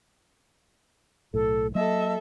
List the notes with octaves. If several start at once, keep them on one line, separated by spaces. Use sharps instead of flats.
B1 A2 A4
F#3 A#3 A4 D#5 E5